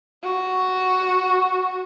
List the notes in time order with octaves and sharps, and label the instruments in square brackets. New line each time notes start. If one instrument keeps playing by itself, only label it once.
[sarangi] F#4